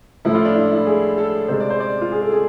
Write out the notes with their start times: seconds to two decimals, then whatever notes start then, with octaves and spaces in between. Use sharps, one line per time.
0.25 A2 F3 A3 E4
0.35 F4
0.45 D4
0.55 E4
0.72 E4
0.87 G#4
1.18 A4
1.48 C3 G#3 C5
1.60 D5
1.70 C5
1.80 D5
2.01 F4
2.12 G#4
2.21 A4
2.32 G#4